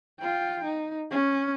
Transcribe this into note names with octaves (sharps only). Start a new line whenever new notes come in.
F4 G5
D#4
C#4